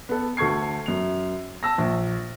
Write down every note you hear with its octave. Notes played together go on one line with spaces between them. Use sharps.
B3 A4
D2 A4 C#6 G#6 C7
F#2 F7
A5 E6 A#6
A#1